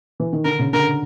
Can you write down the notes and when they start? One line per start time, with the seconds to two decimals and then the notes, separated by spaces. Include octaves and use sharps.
0.20 E3
0.33 D#3
0.44 D3 A#4
0.59 C#3
0.73 D3 A#4